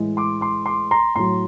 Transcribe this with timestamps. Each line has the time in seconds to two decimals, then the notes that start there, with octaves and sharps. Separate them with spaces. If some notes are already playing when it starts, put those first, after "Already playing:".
Already playing: A2 E3 G#3
0.17 C6 D6
0.41 C6 D6
0.66 C6 D6
0.91 A#5 C6
1.15 A2 F#3 A#5 C6